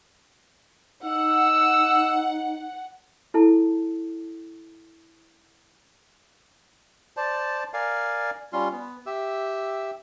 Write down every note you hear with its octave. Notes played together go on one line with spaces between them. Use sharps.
D#4 F#5 E6
E4 A4 A5
C5 D5 A5
A#4 D5 F5 G#5
G3 C#4 F4 C6
B3
G4 E5 E6